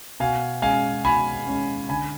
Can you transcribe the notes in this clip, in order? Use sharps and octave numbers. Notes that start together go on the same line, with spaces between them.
B2 F5 G#5
G#3 C#4 F5 G#5
B2 G#5 B5
G#3 C#4
D3 G#5 B5